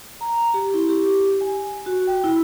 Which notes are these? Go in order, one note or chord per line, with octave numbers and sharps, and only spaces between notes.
A#5
G4
E4
G4
G4
G#5
F#4
G5
E4